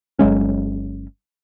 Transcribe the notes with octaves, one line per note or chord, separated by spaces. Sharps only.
G1 F#3 G#3 C#4